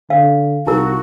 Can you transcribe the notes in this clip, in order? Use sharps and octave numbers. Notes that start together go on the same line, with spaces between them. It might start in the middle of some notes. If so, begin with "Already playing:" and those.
D3 F5
C2 D#4 E4 F#4 A#4